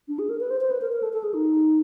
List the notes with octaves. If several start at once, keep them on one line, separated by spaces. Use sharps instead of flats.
D4
G#4
A#4
B4
C5
C5
B4
A#4
A#4
A4
A4
G#4
D#4